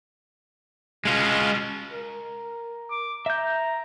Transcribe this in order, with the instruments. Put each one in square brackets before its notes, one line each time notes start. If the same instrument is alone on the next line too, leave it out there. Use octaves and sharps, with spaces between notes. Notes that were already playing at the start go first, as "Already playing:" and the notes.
[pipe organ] B2 C#4 [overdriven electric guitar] G#3 F4
[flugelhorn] A#4
[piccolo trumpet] D6
[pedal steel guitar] E5 G6 [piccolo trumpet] A#5